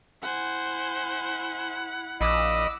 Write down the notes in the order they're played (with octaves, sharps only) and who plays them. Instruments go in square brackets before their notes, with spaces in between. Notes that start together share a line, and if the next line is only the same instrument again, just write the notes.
[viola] E4 F#5 [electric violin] C5 G#5
[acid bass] A#1 [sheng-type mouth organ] D#5 B5 [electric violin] D6 E6